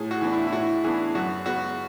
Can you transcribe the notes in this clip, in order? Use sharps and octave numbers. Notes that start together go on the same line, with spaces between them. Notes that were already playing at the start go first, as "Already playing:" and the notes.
Already playing: A2 G#4
F#4
E3 B3 D4
E4
E4
A2 F#4
E3 B3 D4 G#4
F#2 F#4
C#3 G#3 B3 F#4